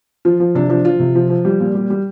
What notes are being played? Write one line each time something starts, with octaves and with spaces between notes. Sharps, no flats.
F3 F4
F3
C3 D4
F3 D4
F3 F4
C3
F3
F3
G3 G4
A#2
G3
G3